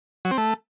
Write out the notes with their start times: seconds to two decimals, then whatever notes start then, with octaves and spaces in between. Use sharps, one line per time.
0.25 F#3
0.31 C4
0.38 A3